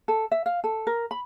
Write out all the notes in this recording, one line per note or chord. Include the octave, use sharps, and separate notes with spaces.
A4
E5
F5
A4
A#4
B5